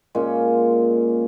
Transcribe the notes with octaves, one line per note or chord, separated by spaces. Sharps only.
A#2 G#3 C#4